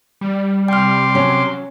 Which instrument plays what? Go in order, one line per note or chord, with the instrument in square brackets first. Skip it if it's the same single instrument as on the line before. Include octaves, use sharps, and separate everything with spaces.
[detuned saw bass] G3
[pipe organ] C3 C6 D6 [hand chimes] G5 F6
[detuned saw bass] F#3 [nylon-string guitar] C#4